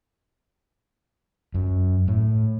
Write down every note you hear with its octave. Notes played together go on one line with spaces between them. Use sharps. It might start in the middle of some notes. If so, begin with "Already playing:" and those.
F#2
A2